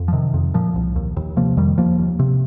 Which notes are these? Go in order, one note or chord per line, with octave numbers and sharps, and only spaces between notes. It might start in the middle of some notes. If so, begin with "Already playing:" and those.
Already playing: F2
F3
C3 D#3
F2
A#2 F3
C2
D#2
D#2
C3 F3 A#3
F2 D#3 G3
D#2 F3 A#3
D#2
C3